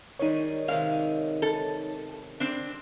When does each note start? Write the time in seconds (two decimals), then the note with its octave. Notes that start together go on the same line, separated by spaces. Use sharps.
0.19 D#3 G3 G#3 D#4 C#5
0.68 C3 D#3 G#3 F5
1.42 A4
2.40 C4 D4